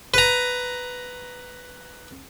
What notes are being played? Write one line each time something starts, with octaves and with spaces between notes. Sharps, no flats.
B4 A#5